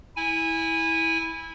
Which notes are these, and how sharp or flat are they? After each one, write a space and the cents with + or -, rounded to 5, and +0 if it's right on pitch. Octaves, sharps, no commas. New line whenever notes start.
E4 -15 G#5 -10